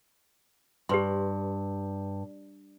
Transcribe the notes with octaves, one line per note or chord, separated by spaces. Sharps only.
G2 G4 B4 C6